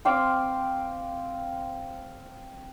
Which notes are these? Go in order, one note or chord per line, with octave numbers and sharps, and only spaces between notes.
C4 F5 G5 D6